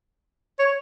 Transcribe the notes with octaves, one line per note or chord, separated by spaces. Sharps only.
C#5